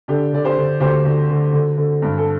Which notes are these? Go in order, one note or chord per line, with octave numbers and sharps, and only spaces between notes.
D3 D4 G4
D3 D5
G4 C5
D3
D2 G4 C5
D2
D3
D3
D3
G2
A4